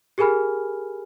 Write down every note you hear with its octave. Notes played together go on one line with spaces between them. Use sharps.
G4 G#4 A#4 G#5 B5 F6